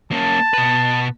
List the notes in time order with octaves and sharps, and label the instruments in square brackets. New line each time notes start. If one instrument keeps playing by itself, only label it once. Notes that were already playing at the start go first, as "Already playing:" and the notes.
[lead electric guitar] A#3 C#4 [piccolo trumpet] A5
[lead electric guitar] B2 B4